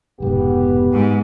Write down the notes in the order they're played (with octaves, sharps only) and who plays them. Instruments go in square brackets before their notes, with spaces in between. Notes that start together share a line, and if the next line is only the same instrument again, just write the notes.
[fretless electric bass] F1 G#2 B2 [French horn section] B3 G4
[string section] G#2